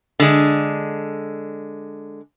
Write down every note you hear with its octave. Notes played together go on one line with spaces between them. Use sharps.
D3 G#3